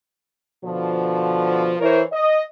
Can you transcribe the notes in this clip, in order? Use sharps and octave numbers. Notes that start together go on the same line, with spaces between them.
B2 D3 F3
E3 E4 A#4 C5 C#5
D#5